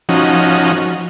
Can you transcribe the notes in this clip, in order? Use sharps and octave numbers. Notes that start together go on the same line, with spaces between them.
F3 C#4 D#4 F#4